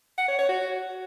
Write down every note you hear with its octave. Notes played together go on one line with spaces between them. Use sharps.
F#5
C#5
C#5
F#4